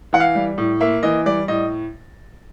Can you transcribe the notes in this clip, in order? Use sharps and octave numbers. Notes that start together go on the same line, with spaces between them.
E3 F#5
F5
G3
A2
A#3 E5
E3 D#5
G3 D5
A2 D#5